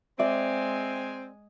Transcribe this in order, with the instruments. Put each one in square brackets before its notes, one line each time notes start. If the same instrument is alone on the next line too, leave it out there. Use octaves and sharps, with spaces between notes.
[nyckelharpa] G#3 G#5 [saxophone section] C4 [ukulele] D5 [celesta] E5